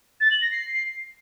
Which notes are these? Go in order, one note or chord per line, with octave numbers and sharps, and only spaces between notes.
A6
F#7
A#6
C7